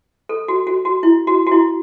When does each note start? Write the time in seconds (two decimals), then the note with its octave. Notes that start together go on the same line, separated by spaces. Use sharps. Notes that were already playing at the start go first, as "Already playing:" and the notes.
0.29 A4
0.48 F#4
0.67 F#4
0.85 F#4
1.03 E4
1.27 F#4
1.46 F#4
1.52 E4